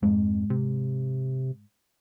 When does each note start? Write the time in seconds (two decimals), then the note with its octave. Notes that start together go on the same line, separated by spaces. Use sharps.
0.02 F2 G#2 G#3
0.50 C3